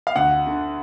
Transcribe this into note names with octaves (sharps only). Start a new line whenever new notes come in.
F5
D2 F#5
D3